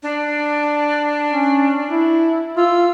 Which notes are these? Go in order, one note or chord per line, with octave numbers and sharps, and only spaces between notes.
D4
C#4
E4
F4 E6